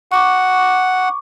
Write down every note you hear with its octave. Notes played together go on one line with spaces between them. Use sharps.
F#5 C#6 D6